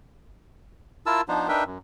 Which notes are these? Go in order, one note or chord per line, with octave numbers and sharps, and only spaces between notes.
E4 F4 A#4 A5 E6
F3 B3 D4 D#4 C5
D4 D#4 A#4 B4 E5 G5
F#2